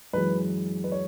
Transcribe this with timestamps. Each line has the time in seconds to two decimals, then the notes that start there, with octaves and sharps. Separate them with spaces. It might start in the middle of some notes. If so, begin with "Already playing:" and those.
0.13 F#2 E3 G#3 B4
0.84 B4
0.92 C#5